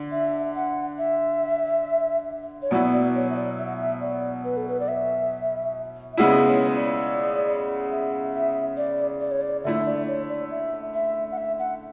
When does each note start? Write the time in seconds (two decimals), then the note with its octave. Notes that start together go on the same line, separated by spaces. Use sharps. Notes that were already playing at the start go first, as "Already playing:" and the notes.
Already playing: D3
0.11 E5
0.55 F#5
0.98 E5
2.62 C#5
2.71 B2 F#3 B3 E4 D5
2.93 D5
3.15 C#5
3.30 E5
3.36 D5
3.58 E5
3.67 F#5
3.76 E5
4.01 D5
4.44 B4
4.57 A4
4.68 B4
4.80 D5
4.88 E5
6.13 E5
6.17 C#3 G#3 B3 E4 D5
6.47 C#5
6.75 D5
7.91 E5
8.34 E5
8.77 D5
9.21 D5
9.31 C#5
9.41 D5
9.64 D3 A3 E4 E5
9.86 D5
10.07 C#5
10.29 D5
10.51 E5
10.94 E5
11.32 F#5
11.37 E5
11.59 F#5